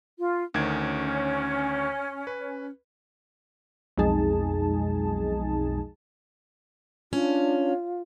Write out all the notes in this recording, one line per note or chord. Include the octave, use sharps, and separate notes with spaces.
F4
D2 D#3 C#4 G#6
B4
B1 F2 G#3 D#4 G#4 A5
C#4 D4 F4